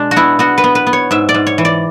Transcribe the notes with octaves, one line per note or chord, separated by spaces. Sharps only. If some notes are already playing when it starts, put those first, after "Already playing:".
Already playing: B2 G#3 D4
F#4
B3 E4
B3 F#4
B4
B3
B4
B3
C#5
G#2 E5
D5
G#2
C#5
E3
D5